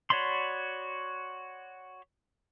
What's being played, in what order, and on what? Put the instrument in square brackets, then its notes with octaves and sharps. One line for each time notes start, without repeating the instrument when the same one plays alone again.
[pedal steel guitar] F#4 C#5 D5 B5 C6